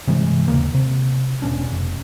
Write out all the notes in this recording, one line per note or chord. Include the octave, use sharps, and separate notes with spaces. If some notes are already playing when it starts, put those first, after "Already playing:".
G2 C3 E3 G#3
D#2 C#3 A#3
C3
E1 B2 C#4 D4
F1